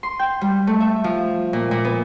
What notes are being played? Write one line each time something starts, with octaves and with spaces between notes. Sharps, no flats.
C6
G5
G3
A3
E5
F3
A#2
A#2
B3